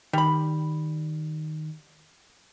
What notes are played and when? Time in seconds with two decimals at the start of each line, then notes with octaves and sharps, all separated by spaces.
0.13 D#3 G3 B5